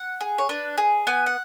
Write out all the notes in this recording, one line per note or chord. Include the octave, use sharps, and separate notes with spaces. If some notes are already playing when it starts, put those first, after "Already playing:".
Already playing: F#5
G#4
C#5
D4 B4
G#4
B3 G#5
F#5